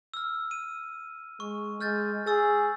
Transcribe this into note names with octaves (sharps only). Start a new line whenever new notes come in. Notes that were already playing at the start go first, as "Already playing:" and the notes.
E6 F6
D#7
G#3 C#6
G#3 F6 G6 A6
G#4 C#6 E6 A6